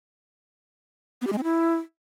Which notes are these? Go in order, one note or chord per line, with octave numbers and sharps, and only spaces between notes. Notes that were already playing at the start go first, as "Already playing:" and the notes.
B3
G4
G#3
C4
E4